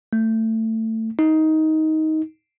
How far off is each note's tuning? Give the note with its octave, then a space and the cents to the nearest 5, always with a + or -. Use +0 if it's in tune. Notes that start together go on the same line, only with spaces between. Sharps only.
A3 +20
D#4 +15